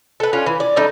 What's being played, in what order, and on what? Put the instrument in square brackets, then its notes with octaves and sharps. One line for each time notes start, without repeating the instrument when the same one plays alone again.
[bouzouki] A4 B4
C#4 D4 F4
E3
D5
G3 A3 D#4